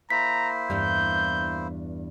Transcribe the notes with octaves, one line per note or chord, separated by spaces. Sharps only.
A#3 E4 C5 A#5 B6
E2 G2 G3 G6